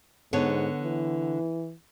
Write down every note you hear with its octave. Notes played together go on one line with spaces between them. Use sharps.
G#2 D3 B3 C#5
E3